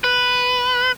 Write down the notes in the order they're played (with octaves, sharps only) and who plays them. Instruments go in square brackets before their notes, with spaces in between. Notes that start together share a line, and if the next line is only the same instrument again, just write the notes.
[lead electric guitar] B4